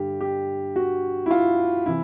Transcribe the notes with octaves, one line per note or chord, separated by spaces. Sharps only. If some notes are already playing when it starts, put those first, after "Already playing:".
Already playing: G2 D3 G4
G4
F#4
E4
F4
C3 E3 E4